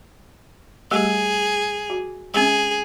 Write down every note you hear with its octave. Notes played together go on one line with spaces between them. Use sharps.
G3 A3 G4 G#4
F#4
G#3 C4 C#4 G#4